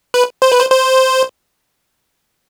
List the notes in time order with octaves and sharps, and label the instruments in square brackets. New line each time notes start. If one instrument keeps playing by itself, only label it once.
[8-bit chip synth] B4
C5
B4
C5
C5